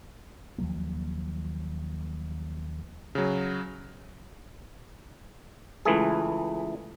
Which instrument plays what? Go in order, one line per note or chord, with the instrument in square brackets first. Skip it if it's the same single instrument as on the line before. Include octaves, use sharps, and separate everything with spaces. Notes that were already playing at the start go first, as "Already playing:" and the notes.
[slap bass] D#2 F3 F#3 A#3
[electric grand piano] C#3 F#3
[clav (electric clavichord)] C#2 E3 A3 G#4